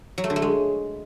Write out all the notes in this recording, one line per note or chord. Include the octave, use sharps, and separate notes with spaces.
F#3
A3
D3
A3
G#3